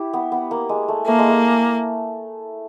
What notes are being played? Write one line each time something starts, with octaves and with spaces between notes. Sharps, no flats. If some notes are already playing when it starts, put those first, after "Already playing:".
Already playing: E4 G4
B3
B3
A#3
G#3
A3
A3 A#3
G#3
A3